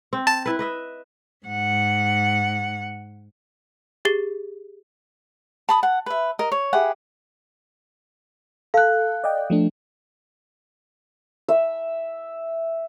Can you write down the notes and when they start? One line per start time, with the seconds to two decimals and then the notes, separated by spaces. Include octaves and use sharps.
0.13 C4
0.27 A5
0.46 E4 B4
0.59 B4 D#5 E5
1.46 G#2 F#5
4.05 G4 G#4 A6 C7 G7
5.69 A5 B5 D#6
5.83 F#5
6.06 B4 E5
6.39 A#4 D#5
6.52 C#5
6.73 E4 G4 G#4 F#5
8.74 A4 F5 F#6
9.24 D5 D#5 G5
9.50 F3 A3 D4
11.48 E5